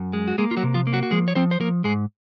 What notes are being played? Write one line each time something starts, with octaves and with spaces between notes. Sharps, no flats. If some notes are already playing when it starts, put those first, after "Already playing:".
Already playing: F#2
G#3
F#4
G#3 A#3 G#4
F4
F#3 F#4
C3
F3 F4
A#3
F#3 F#4
F#4
F3 G#3 G#4
C#5
F3 C4 C5
C5
F3 A#3 A#4
G#2 G#3 G#4